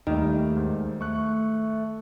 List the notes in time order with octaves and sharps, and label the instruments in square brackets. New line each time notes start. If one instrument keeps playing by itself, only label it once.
[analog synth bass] D#2 [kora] D#3 [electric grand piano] G3 A3 A#3
[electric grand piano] G#2
[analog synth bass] A3 [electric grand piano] C#6 F#6